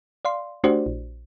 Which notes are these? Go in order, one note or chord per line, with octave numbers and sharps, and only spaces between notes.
D5 F5 C6
A3 D4 F#4 G4 C5 D5
A#1